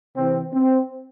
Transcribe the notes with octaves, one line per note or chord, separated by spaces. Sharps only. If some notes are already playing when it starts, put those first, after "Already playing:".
C3 E3 C4
C4